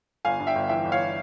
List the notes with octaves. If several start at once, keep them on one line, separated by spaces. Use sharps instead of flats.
G1 F5 G#5
G2
E5 G5
G1
E3 E5 G5
G1
C#5 F5